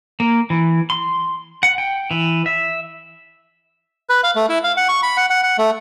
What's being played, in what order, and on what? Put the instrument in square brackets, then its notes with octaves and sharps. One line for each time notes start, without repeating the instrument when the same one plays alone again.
[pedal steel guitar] A#3
E3
C6
F#5
G5
E3
E5
[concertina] B4
F5
A3
E4
F5
F#5
C#6
B5
F#5
F#5
F#5
A3